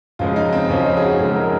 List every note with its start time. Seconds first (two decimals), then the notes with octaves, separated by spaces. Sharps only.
0.19 F#2 C#3 F3 G#3 F4
0.36 D#4
0.53 C4
0.69 F#2 C#3 F3 G#3 C#4
0.86 D#4
0.97 G#4
1.03 F#4
1.19 F#2 C#3 F3 G#3 G#4
1.36 A#4